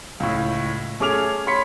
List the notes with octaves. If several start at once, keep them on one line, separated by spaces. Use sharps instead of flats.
C#2 A2
A3 C#4 G#4 D6 F6 F7
C#5 B5 C6 B6 C#7